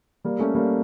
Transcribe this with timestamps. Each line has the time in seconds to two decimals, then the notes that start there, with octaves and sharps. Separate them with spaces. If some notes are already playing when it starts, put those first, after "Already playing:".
0.24 G3 A#3
0.39 A3 C#4
0.55 G3 A#3